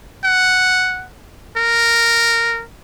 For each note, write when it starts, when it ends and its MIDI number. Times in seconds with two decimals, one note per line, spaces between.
0.24 1.06 78
1.57 2.64 70